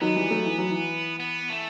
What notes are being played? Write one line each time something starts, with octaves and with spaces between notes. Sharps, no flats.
D#3 F#3 B3
E3 G3
F#3 A3
E3
F#3
E3
B3
A3